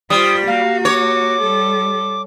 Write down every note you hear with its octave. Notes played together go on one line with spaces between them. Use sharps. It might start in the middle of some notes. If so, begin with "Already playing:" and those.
G3 F4 C5 D#6
A#3 F#4 F5
C#5 D6
G3 A4